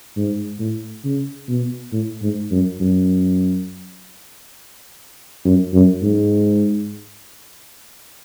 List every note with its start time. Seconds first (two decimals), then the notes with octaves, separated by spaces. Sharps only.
0.17 G#2
0.60 A2
1.04 C#3
1.48 B2
1.93 A2
2.22 G#2
2.51 F#2
2.80 F#2
5.45 F#2
5.74 F#2
6.03 G#2